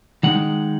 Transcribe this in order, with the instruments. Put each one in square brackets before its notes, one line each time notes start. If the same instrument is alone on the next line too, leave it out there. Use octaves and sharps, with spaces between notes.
[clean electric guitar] D#3 G#3 D#4 F#5